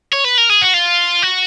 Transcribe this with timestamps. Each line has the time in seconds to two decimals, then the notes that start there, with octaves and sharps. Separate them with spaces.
0.13 C#5
0.24 B4
0.38 A#4
0.50 G#4
0.62 F#4
0.74 F4
1.23 F#4